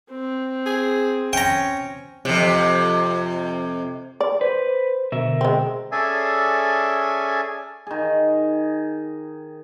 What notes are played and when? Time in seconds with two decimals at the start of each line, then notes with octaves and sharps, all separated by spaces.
0.10 C4
0.66 G#4
1.33 C#4 G5 A#5
2.25 F2 C3
4.20 D5
4.41 B4 C5
5.12 B2 D3 A#4 E5
5.41 G#3 C4
5.92 C#4 G#4 A4 D5 E5 G#5
7.87 D#3 G#4